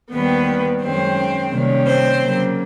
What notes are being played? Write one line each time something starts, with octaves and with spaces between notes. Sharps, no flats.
D#2 D#3 G3 B3 C4 B4
F#2 D#3 G#3 C4 C#4 C5
C3 D#3 G3 A#3 C#4
C4 C5
C#3 F#3 A#3